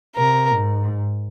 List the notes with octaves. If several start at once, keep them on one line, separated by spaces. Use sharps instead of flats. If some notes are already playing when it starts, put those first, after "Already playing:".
C3 A#4
G#2